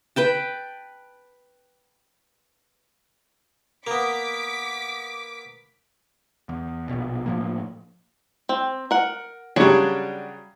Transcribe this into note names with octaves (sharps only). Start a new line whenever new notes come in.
B4 G5 A5
A#3 B3 D6 B6
E2
A#1 B2
A2 F3 A#3
C4
A#4 F#5
C#3 F#3 G3 D4 F#4 C#5